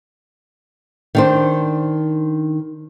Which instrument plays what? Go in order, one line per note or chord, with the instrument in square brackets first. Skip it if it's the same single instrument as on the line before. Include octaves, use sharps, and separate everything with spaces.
[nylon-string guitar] D#3 D4 C5